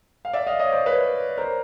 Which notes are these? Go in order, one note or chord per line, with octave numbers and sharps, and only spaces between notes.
F5
D5 E5
D#5 F5
C#5 D#5
C5 D5
B4 C#5
A#4 C5